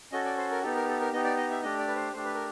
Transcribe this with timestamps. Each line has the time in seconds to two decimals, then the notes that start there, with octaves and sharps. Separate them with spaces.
0.12 C#4 F#4 A4 D#5
0.25 D5
0.37 C5
0.51 A#4
0.62 B3 D#4 G4 A4
0.75 A#4
0.88 A4
1.00 A#4
1.13 B3 D#4 G4 D#5
1.25 D5
1.37 D#5
1.51 E5
1.62 A3 D4 G4 D#5
1.79 D5
1.88 B4
1.96 C5
2.13 A3 D4 G4 C5
2.24 B4
2.35 A#4